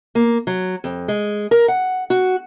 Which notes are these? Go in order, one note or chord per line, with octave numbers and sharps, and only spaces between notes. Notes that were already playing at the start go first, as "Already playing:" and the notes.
A#3
F#3
F2
G#3
A#4
F#5
F#4